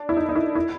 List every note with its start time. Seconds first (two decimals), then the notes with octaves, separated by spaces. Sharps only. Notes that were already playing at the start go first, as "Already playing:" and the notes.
Already playing: D4
0.09 E4
0.17 D#4
0.29 D#4
0.36 E4
0.55 E4